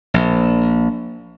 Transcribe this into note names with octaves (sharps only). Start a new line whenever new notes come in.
A#1